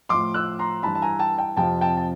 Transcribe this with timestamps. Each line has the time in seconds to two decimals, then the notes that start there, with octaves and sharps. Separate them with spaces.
0.09 A2 F3 C6 D6
0.34 E6 F#6
0.59 A#5 C6
0.83 G2 E3 A5 B5
0.95 A5
1.02 G#5 A#5
1.19 G5 A5
1.38 G5 A5
1.57 F2 C3 F3 G5 A5
1.81 G5 A5
1.97 A5